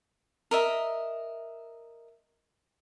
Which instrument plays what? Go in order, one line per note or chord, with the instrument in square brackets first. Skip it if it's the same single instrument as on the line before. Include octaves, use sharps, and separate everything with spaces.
[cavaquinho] A#4 D#5 E5